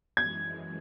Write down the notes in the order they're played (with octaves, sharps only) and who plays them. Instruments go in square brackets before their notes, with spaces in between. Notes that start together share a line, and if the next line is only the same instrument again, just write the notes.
[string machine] F#2 E3 G#3 [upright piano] G#6